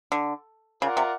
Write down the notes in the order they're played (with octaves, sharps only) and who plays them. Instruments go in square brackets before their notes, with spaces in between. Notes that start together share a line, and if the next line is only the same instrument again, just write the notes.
[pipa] D3
[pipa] C#3 [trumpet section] F4 A#4 D5 F#5
[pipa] C3